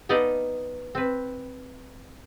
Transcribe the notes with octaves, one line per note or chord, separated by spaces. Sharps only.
B3 D#4 A4 D5 D#5 F5
C4 B4